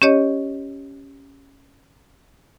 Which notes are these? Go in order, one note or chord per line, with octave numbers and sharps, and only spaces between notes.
C#4 G4 C#5 D#5